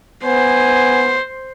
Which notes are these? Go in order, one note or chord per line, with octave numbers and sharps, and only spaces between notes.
B3 C5 G#5